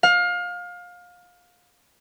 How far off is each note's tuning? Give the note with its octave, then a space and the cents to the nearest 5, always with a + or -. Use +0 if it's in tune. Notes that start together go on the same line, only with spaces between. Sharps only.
F5 +25